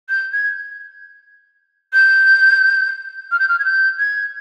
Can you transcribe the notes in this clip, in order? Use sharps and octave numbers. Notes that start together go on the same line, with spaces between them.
G6
G#6
G6
F6
G6
F6
G#6
G6
G#6